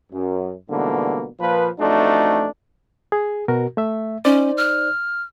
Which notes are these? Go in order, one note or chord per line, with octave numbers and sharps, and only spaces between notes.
F#2
G#2 B2 D3 E3 G3 A#3
A#2 F3 B4
A1 F2 A3 D4 D#4 F#4
G#4
B2 F#4 A#4
A3 E5
C#4 D#4 C5 D5
F6